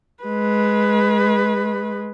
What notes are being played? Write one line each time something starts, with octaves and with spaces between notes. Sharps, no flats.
G#3 B4